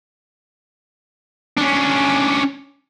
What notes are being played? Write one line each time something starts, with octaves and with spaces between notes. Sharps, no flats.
C#4 D4